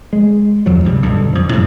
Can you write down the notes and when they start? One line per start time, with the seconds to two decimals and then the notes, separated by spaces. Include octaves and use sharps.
0.13 G#3
0.66 E2 F3 F#3
0.84 D2 G2 C3 G3
1.02 B1 G2 B2 D3
1.33 F2 F3
1.52 F#2 A2 C3 F3